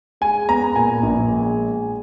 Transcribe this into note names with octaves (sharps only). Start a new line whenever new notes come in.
G#3 G#5
B3 A#5
A#2 G#5
A#1
G#3